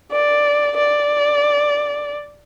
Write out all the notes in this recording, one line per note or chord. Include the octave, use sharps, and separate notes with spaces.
D5
D5